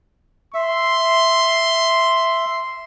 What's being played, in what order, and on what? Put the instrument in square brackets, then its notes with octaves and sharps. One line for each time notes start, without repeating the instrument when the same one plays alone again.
[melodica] E5 [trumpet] C6